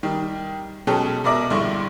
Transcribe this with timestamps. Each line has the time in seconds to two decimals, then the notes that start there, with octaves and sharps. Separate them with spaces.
0.03 D#3 G3
0.87 B2 F#3 G#3 C#4 G4 A4
1.24 B2 A#4 D5 E5 D6 A#6
1.50 A#1 G2 D3 E4 C6 C#6